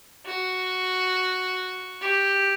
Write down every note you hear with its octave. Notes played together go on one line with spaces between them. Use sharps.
F#4
G4